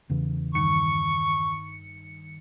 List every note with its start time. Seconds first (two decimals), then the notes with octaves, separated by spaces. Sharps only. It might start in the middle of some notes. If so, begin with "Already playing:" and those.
0.10 E2 C#3 E3
0.55 G2 D#3 C#6 C#7